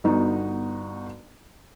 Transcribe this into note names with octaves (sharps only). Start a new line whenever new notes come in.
G1 B3 D#4 F#4